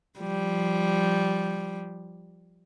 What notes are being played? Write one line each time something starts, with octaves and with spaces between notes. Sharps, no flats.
F3 G3